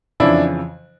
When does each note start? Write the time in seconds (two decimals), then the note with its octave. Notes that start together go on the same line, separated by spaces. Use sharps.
0.20 F2 C#3 E3 D4 E4